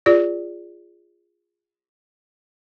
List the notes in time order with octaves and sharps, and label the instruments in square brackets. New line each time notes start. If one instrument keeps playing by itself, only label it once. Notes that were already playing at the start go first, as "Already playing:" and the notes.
[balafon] F4 G#4 D5